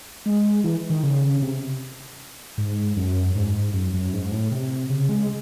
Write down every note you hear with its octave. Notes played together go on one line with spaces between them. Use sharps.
G#3
E3
D#3
C#3
C3
G#2
F#2
G#2
F#2
F#2
G#2
A2
C3
C#3
G#3